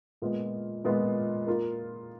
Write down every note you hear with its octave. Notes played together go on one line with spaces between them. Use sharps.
A#2 G#3 B3 F4
A#2 G#3 B3 F4
A#3 F4 A#4